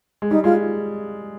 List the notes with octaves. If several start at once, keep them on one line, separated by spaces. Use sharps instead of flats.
G#3
G3 D#4
G#3 F4